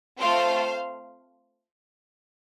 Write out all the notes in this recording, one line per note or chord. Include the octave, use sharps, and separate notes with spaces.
A3 C4 F4 A4 C5 F5